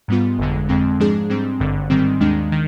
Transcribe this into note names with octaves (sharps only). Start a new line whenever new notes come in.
G#2 G3 B3 F4
G1 F2 D3 G#3
F2 D3 G#3 C4
G#2 F3 G#3 D4 G#4
G#2 G3 C4
G#1 G2 D3
G#2 D#3 G3 C4
D#2 D#3 G#3 D4
D#3